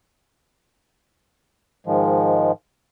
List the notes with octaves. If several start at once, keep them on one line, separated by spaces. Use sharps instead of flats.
G#2 D#3 F3 G#3